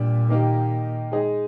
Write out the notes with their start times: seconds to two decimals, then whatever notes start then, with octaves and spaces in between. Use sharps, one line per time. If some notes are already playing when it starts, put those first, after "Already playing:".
Already playing: A#2 G3 D4
0.29 D#3 A#3 D#4 G4
1.12 G#3 D#4 G#4